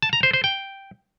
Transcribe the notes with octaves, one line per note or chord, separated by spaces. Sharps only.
A5
A#5
C5
C5
G5